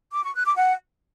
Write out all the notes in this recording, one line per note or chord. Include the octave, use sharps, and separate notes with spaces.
D6
C#6
F#6
D6
F#5